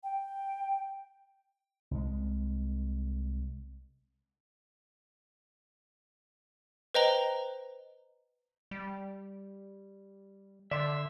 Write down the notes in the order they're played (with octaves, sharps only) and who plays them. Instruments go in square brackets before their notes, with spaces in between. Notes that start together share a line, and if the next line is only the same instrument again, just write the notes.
[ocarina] G5
[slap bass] C2 G#3
[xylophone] B4 C5 D#5 G5 A#5 G7
[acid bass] G3
[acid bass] D3 [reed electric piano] D5 C6 [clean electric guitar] E5